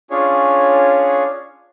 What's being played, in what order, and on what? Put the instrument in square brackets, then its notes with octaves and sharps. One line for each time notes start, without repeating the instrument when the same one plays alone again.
[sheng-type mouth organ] C#4 D4 F4 G#4 C#5